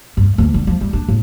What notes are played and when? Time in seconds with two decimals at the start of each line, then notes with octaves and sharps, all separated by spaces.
0.17 G2
0.38 D2
0.54 D3
0.67 F3
0.81 G3
0.93 D4
1.08 A2